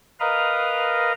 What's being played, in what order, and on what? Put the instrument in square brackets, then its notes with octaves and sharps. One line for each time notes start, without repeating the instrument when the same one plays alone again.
[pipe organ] A#4 B4 D#5 F5 A#5